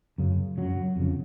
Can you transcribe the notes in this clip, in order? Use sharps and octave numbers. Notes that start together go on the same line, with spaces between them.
F#2 C#3
F#2 C#3 F#3
F2 C#3